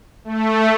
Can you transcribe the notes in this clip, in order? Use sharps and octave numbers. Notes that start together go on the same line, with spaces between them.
A3